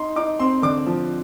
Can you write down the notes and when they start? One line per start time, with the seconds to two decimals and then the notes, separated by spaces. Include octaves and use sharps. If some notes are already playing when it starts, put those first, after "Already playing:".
Already playing: D#4 C6
0.16 D#4 D6
0.39 C4 C6
0.62 D3 D6
0.86 F3